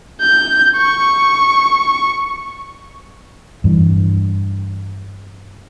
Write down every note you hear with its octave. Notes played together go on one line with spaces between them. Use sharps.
G6
C#6
G2 E3